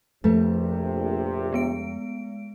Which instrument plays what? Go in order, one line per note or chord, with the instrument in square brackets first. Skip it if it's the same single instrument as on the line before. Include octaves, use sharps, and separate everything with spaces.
[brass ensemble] A#1 C3 [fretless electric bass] F2 [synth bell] F3 B4 [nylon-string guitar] A3
[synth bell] G#3 B3 D7